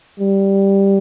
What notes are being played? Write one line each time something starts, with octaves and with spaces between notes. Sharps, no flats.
G3